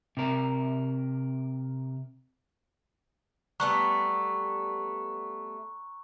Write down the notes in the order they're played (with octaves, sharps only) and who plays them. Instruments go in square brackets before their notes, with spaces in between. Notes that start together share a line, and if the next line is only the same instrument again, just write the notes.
[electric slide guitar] C3 A#4
[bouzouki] G3 A3 B3 [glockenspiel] A#5 C#6 F#6